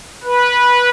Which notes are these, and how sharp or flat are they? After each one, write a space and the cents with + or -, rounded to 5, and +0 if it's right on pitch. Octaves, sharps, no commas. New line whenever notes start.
B4 -15